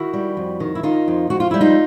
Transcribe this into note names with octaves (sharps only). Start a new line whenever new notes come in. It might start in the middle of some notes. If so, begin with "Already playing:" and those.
Already playing: D#3 E4 F#4
G3
F2
D#3
E4
D#3 D#4 F4
F2
F2 F#4
F4
G3 E4
D#4 F4